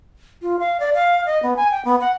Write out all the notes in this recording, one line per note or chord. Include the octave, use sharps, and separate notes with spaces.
F4
F5
D5
F5
D#5
B3
G#5
G5
B3
F#5